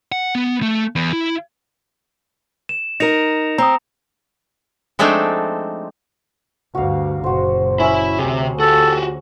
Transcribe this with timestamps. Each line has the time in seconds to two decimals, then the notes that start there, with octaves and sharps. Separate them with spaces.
0.12 F#5
0.35 B3
0.62 A3
0.96 E2
1.13 E4
2.69 E7
3.00 D#4 A#4 A#6 C#7 F7
3.58 C4 A#5 D#6
4.99 F3 G#3 A3 C4 D4 D#4
6.75 D2 G2 F#4 F5
7.24 F#1 A#2 F#4 C5
7.80 C#4 E4 E6
8.19 D2 C3 G#4
8.60 F#4 G4 A4